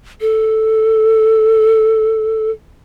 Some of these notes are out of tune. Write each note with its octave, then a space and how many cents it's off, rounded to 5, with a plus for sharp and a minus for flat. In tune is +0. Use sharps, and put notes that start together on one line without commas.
A4 +0